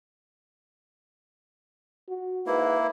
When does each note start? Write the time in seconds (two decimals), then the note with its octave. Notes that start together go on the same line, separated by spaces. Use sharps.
2.09 F#4
2.47 G#2 A#3 E4 B4